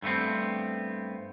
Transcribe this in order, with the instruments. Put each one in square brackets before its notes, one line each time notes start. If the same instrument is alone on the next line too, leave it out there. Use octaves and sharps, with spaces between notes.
[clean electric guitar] G2 A3 B3 C4